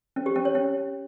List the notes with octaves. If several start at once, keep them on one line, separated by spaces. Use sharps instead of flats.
C#4
G4
C#4
C#5
C#4